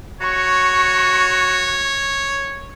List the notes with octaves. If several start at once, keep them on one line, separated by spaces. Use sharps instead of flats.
F#4 C#5 C#6